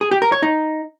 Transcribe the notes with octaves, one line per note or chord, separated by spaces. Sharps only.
G#4
G4
A#4
C#5
D#4